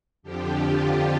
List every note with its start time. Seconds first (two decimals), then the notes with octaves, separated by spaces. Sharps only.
0.23 F2 D3 F3 G4
0.58 F4